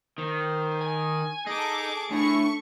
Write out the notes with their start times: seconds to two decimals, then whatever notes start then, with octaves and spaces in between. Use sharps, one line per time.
0.18 D#3 C5
0.81 G#5
1.46 D#4 G#4 A4 D6
2.11 A2 A3 D4 C#6